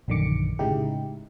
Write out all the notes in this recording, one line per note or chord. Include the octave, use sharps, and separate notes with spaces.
A#1 F#2 D3 D#3 D6 C#7
A2 C#3 G#3 D#4 E4 G4